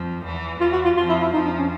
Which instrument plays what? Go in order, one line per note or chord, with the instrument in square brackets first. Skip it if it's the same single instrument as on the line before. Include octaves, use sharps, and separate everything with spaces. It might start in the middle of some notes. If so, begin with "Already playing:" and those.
Already playing: [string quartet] F2 F3
E2 E3
[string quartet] E2 E3 [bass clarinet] F4
[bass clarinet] F#4
F4
[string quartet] F2 F3 [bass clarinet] F4
[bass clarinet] E4
E4
[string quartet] F2 F3 [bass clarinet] D#4
[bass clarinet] D4
C#4